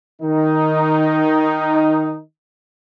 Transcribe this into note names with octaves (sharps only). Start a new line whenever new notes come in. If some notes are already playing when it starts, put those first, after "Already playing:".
D#3 D#4